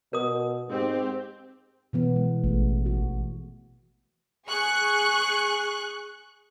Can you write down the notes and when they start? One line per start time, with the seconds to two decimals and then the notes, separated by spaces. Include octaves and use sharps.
0.13 B2 A#4 D#6
0.69 G#2 C4 G4
1.93 B2 E3 B3
2.16 G#3
2.44 A1 A3
2.86 F#4
4.45 G#4 C#6 F#6